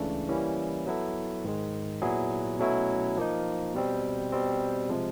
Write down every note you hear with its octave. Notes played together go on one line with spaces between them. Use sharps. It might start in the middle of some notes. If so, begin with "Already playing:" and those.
Already playing: C#2 C#3 E3 A3 D4
E3 G3 A#3 C#4 E4
F#3 B3 E4 A4
G#2 D#3 G#3
A#2 F#3 B3 E4 G#4
B2 F#3 A3 C#4 E4
F3 A#3 D#4
B2 G3 C4
B2 G3 C4
C3 F3 G#3